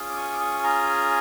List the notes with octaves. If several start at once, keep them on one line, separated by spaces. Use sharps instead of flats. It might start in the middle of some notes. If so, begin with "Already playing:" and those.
Already playing: C#4 F4 G#4
D6
C#6 D#6
D6
C#6 D#6
G#5 A#5